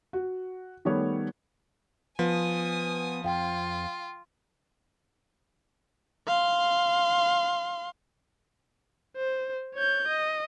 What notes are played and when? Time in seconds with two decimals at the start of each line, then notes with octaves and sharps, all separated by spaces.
0.13 F#4
0.85 D#3 G3 A3 B3 C#5
2.19 F3 B3 G#5 D#6
3.24 F2 F4 F5 G5
6.27 F5 C6
9.16 C5
9.74 C#5 G6
10.08 D#5